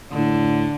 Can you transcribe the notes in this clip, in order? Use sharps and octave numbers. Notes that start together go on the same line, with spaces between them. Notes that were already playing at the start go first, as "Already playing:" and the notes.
A2 D3